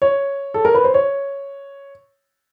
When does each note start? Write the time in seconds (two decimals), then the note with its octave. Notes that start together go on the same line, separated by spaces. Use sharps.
0.02 C#5
0.54 A4
0.65 A#4
0.74 B4
0.84 C5
0.94 C#5